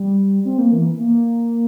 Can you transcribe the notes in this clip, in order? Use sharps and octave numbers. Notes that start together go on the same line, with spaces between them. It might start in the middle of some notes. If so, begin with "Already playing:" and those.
Already playing: G3
C4
A#3
E3
A#3